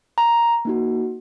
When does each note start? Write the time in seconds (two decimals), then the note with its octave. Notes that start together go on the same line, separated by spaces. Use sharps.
0.18 A#5
0.65 A#3 D#4 F#4